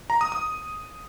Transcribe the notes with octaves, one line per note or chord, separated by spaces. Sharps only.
A#5
D#6
D#6